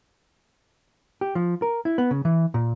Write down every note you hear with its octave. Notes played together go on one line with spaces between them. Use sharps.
G4
F3
A#4
E4
B3
C#3
E3
A#2